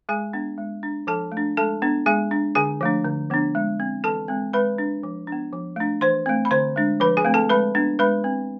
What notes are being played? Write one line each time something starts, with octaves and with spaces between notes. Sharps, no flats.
G#3 G#4 G#5
B3 D4
G#3
D4
F3 A4 A5
A3
D4
G#3 A4 A5
B3 D4
G#3 G#4 G#5
D4
D3 G#4 G#5
F3 A3 D4
D3
F3 B3 D4
G#3
C4
E3 A4 A5
G#3 C4
G#3 B4 B5
D4
F3
D4
B3
F3
A3 D4
E3 C5 C6
A3 C4
B5
D3 C5 C6
G#3 D4
F3 B4 B5
G#4 G#5
A3 C4
A4 A5
G#3 B4 B5
B3 D4
G#3 B4 B5
C4